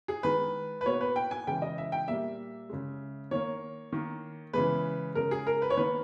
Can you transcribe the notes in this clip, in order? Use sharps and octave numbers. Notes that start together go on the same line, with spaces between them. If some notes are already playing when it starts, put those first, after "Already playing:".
G#4
D#3 G#3 B4
B4
B2 A#3 C#5
B4
G5
G#5
C#3 E3 G#3 G5
D#5
E5
G5
A#2 G3 A#3 E5
C#3 G#3
D#3 A#3 C#5
D#3 A#3
C#3 E3 G#3 B4
C#3 G#3 A#4
G#4
A#4
B4
C#5
D#3 A#3 B4